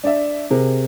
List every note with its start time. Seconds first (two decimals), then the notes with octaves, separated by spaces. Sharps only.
0.04 D4 D5 E5
0.50 C3 G#4 A#4